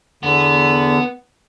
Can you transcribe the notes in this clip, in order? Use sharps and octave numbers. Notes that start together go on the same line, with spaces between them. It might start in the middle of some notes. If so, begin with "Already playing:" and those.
E2 D3 B3